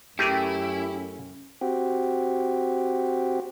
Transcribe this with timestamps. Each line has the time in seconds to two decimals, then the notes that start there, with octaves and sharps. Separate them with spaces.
0.19 F#2 A3 C#4 E4 G4 G#4 A#4
1.61 C4 F#4 G4